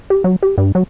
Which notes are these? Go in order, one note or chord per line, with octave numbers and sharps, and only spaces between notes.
G4
F#3
G4
G2
F#3